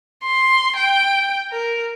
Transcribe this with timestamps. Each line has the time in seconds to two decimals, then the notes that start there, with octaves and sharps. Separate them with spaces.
0.24 C6
0.77 G5
1.52 A#4